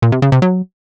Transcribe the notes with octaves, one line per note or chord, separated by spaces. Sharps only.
A#2
C3
C#3
C3
F#3